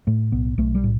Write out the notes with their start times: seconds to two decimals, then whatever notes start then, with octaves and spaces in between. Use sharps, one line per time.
0.07 A2 A3
0.32 B1 B3
0.58 B1 A3
0.75 G3
0.84 A2